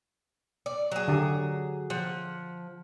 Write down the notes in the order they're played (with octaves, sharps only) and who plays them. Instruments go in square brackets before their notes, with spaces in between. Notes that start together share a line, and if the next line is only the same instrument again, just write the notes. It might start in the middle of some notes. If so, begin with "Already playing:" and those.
[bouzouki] D5
F#3 G#4
[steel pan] D3 G4
[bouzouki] F3 F#5